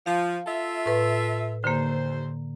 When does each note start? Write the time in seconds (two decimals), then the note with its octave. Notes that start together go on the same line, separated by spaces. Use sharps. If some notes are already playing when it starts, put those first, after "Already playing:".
0.06 F3 F5
0.47 F4 A4 E5
0.86 A2 B4
1.64 D#2 D3 A#3 C5